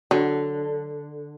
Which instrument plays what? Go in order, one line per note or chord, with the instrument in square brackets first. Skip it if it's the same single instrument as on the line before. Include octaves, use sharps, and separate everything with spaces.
[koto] D3 [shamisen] F#3 F#5